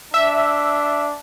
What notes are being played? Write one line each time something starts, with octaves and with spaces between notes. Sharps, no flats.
D4 E5